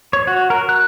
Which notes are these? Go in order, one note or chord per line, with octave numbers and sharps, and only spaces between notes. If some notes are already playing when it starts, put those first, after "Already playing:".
C#5
F#4
A#4
F#6